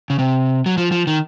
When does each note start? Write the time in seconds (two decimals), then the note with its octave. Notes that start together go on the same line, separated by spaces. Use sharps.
0.10 C#3
0.19 C3
0.66 F#3
0.78 F3
0.92 F3
1.07 D#3